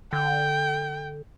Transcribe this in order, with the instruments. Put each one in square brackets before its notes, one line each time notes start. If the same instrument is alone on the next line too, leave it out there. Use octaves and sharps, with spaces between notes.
[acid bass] D3 [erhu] G5